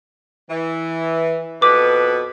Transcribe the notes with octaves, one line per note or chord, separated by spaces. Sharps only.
E3
F2 B2 B4 D6